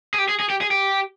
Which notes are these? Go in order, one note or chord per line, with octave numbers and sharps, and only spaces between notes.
G#4
G4
G#4
G#4
G4
G#4
G4